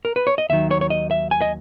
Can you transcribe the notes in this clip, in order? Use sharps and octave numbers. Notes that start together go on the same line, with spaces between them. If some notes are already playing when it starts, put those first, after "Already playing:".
A#4
B4
C#5
D#5
D#2 D#3 F#3 E5
C#5
C#5
D#5
E5
G#5
D#5